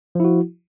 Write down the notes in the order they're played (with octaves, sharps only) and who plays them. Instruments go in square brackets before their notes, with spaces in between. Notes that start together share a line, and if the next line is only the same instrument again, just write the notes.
[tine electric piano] F3
E4
F#4